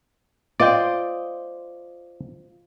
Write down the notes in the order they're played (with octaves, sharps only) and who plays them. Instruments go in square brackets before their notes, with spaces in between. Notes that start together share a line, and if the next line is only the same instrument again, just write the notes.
[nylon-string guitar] F4 C5 D#5 [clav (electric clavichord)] D5 G5